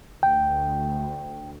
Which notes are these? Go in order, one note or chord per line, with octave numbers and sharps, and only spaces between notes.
D2 G5